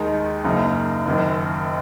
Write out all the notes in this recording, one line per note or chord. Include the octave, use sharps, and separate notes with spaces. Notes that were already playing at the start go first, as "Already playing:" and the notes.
Already playing: D#2 D#3 G#3 D#4
F#1 F#2 C#3 A#3 D#4
F#1 F#2 D#3